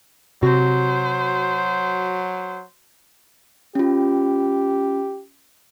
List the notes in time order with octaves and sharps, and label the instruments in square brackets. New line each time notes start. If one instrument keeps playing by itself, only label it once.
[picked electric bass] C3 [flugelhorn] F#3 [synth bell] F#4 [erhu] C5
[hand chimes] C#4 F4 [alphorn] G4